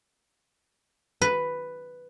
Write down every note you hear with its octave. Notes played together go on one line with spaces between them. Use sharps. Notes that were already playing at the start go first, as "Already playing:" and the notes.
B4